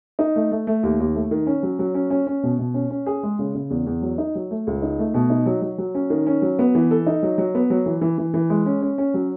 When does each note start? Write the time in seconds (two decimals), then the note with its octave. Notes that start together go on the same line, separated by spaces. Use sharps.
0.19 D#4
0.36 A3
0.51 A3
0.67 A3
0.83 D#2
1.00 D#2
1.15 A3
1.31 D#3
1.47 C#4
1.63 F#3
1.79 F#3
1.95 C#4
2.10 C#4
2.27 C#4
2.43 B2
2.59 B2
2.74 C#4
2.90 C#4
3.06 G#4
3.23 G#3
3.39 C#3
3.55 C#3
3.70 E2
3.86 E2
4.02 F#3
4.18 D#4
4.35 F#3
4.51 A3
4.67 C#2
4.82 D#4
4.99 A3
5.14 B2
5.30 D#4
5.46 F#3
5.62 F#3
5.78 F#3
5.95 C#4
6.10 D#3
6.26 C#4
6.42 F#3
6.59 B3
6.75 E3
6.91 A4
7.07 D#4
7.23 F#3
7.38 F#3
7.55 B3
7.70 F#3
7.86 E3
8.01 E3
8.18 E3
8.34 E3
8.50 G#3
8.66 C#4
8.82 C#4
8.98 C#4
9.14 F#3